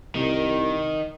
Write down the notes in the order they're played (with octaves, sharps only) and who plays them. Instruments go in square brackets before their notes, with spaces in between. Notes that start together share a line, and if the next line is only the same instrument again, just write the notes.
[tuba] C2 [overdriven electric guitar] D#3